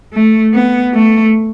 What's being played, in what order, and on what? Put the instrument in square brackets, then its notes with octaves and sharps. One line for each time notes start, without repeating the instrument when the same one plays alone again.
[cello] A3
B3
A3